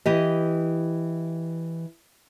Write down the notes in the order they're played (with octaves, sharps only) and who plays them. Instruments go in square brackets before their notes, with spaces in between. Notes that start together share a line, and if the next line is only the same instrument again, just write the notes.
[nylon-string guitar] E3 G4 D#5